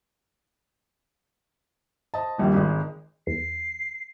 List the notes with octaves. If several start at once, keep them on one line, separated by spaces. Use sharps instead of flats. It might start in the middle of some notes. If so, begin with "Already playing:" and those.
C5 D#5 A5
D#1 A#1 G3
G#1 G#3
E2 C7